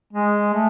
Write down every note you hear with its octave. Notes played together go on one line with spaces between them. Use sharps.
G#3
A3